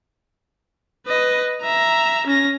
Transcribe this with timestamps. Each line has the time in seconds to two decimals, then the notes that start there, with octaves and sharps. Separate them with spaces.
1.07 B4 D#5
1.62 E5 A#5
2.27 C#4 A#6